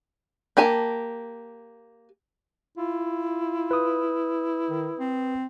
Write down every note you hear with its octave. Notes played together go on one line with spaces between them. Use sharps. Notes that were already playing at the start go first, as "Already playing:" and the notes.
A#3 G4 G#5 A5
E4 F4
B4 D#6
D#3
C4